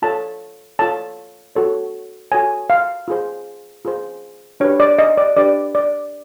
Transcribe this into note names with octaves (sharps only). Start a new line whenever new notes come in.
F4 A4 C#5 A5
F4 A4 C#5 A5
F#4 A4 C#5
F#4 A4 C#5 G#5
F5
F4 G#4 C5
F4 G#4 C5
D4 G4 B4 C#5
D5
D#5
D5
D4 G4 B4 D5
D5